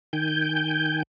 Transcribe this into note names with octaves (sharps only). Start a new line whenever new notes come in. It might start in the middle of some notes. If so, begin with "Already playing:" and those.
D#3 G5 G#5 G6